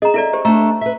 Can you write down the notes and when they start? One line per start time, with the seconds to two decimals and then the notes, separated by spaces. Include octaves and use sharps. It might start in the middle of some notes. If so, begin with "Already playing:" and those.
0.02 G#4 D#5 A#5
0.14 E4 A4 D5 E5
0.33 G4 C5
0.45 A3 D4 A#5
0.81 B4 E5